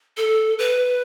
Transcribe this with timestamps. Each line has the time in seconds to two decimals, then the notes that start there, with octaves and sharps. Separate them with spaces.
0.17 A4
0.59 B4